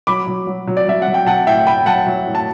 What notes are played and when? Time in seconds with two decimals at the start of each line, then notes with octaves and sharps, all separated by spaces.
0.07 F#3 B5 D6
0.27 F#3
0.47 F#3
0.68 F#3
0.77 D5
0.87 F#3 E5
1.02 F#3 F#5
1.14 G5
1.26 F#3 F#5 A5
1.47 A2 E5 G5
1.66 A2 G5 B5
1.86 F#3 F#5 A5
2.07 F#3
2.26 A2
2.35 A5